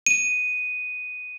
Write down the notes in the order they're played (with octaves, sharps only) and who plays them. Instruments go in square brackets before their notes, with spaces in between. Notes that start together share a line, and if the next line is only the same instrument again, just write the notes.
[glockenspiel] D#7